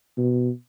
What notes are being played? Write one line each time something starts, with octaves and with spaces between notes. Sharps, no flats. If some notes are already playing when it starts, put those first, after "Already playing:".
B2